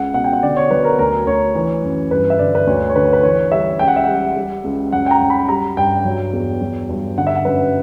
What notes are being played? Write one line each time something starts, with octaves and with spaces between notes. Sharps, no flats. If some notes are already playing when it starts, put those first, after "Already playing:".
Already playing: C#2 F#5
B2 F#5
G5
F#5
D3 D5
C#5
F#3 B4
A#4
D2 A#4
D2 C#5
E3
F#2
G2 B4
E5
D3 D5
B4
D2 C#5
C#5
D3 B4
B4
E3 C#5
G3 E5
C#2 G5
F#5
E5
G3 F#5
G3
C#2
F#2 F#5
G5
A#5
F#2
B5
G3 A#5
G2 G5
F#3
E2
F#3
G2
D3 F#5
E5
F#5
F#2 B4